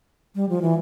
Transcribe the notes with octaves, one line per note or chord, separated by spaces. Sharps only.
G3
F3
E3